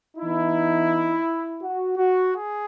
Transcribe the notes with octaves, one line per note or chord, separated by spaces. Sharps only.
E3 B3 D#4 E4
F#4
F#4
G#4